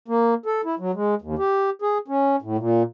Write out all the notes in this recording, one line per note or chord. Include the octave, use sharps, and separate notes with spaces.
A#3
A4
E4
F#3
G#3
D#2
G4
G#4
C#4
A2
A#2